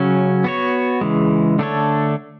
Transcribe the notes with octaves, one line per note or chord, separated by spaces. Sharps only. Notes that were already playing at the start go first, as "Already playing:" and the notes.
Already playing: C#3 F#3 C#4
B3 F#4 C#5
C#3 E3 G#3
D3 A3 D4 A4 C#5